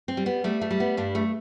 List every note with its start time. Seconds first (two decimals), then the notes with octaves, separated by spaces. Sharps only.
0.08 C4
0.17 G3
0.26 B3
0.44 G3 A3
0.61 A3
0.71 G3
0.80 B3
0.97 G2 D4
1.15 A3